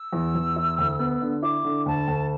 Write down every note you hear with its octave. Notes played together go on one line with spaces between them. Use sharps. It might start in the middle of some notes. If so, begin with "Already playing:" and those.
Already playing: E6
E2
E2
E4
D2
B3
D3
E4 D6
D3
D2 A5
D2